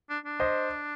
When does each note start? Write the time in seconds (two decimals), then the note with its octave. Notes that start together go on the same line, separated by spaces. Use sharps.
0.10 D4
0.26 D4
0.40 C5 D#5